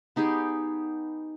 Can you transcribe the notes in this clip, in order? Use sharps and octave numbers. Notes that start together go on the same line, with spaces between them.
B3 D#4 G4 G#4